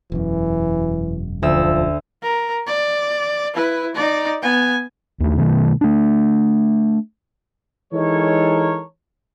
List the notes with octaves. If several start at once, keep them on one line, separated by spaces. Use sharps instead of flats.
E1 F#2 E3
D2 F3 E6
A#4
D5
E4 B4
D#4 D5
B3 G#5
D#2 A3
B2 D#3 E3 A3
A3 D4
E3 G#3 D#4 A4 A#4 C#5